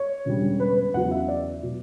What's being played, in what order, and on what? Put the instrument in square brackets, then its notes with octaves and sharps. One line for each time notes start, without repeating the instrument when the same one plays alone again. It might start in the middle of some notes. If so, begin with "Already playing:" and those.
Already playing: [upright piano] C#5
E1 D2 C#3 G3
B4
B4
E2 C#3 F#3 F#5
E5
D5
B2 F#3